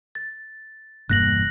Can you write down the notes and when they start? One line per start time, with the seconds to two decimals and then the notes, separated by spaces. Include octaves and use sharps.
0.15 A6
1.10 E1 G2 A#3 F#6 A#6 F#7